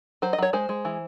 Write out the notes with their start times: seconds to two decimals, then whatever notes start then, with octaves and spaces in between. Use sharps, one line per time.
0.22 F#3 C5
0.33 D#5
0.38 F#3 C#5
0.53 G#3 C5
0.69 G#3
0.85 E3